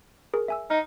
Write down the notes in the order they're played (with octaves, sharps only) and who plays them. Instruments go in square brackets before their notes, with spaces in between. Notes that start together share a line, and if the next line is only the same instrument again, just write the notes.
[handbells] G#4 A#4
E5 G#5 E6
[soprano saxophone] D#4 [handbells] F6